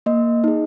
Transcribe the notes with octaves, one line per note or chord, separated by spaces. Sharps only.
A#3 D#5
D#4 G#4